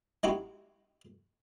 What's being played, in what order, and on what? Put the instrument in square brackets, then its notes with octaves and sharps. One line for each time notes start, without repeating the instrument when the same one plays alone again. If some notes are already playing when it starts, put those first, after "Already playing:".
[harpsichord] G#3 D#4 E4 F#4 G4